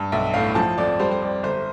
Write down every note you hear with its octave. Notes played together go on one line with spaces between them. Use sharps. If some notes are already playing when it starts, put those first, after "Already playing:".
Already playing: G2
B1 E5
A2 F5
F3 A5
F2 D5
G3 C5
C5
F2 D5
G1 C5